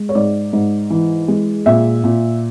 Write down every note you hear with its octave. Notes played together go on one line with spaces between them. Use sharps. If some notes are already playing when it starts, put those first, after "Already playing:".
Already playing: G#3
C#5
G#2 D5
G#2
E3
G#3
A#2 E5
A#2